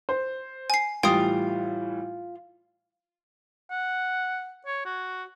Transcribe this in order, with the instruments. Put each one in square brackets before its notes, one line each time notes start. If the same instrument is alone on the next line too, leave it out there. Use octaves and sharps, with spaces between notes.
[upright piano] C5
[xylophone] G#5 C7
[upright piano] A2 E3 G3 [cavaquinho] F4 [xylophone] G5 D#6
[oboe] F#5
C#5
F#4